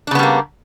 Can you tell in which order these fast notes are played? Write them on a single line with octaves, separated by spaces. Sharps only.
D4 C#3 B3 G3 A#3